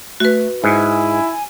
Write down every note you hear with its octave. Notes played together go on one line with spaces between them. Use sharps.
A3 F#4 B4
G#2 E4 G#5